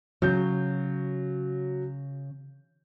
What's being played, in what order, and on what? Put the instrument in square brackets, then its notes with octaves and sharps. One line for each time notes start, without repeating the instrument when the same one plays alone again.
[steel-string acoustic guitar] C#3 [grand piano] F#3 G6